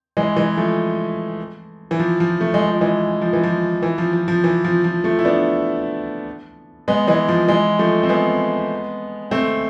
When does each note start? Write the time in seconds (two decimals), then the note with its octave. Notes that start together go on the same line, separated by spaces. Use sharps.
0.17 E3 G#3
0.36 E3 G#3
0.57 F3 A3
1.91 E3
1.99 F3
2.20 F3
2.41 A3
2.54 G#3
2.67 F3
2.81 E3 G#3
3.21 F3
3.33 E3
3.43 F3
3.83 E3
3.98 F3
4.13 F3
4.28 F3
4.44 E3
4.64 F3
4.84 F3
5.04 F3 A3
5.19 E4
5.25 B3 D4
6.88 G#3 B3
7.07 E3 G#3
7.28 F3
7.48 E3 G#3
7.79 F3 A3
8.03 C4
8.09 G#3 B3
9.31 A3 C4